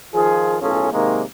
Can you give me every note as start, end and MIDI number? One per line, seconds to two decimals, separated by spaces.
0.14 0.56 51
0.14 0.56 53
0.14 0.56 65
0.14 0.56 68
0.62 0.90 35
0.62 0.90 45
0.62 0.90 61
0.62 0.90 65
0.62 0.90 68
0.62 0.90 69
0.93 1.22 48
0.93 1.22 51
0.93 1.22 56
0.93 1.22 58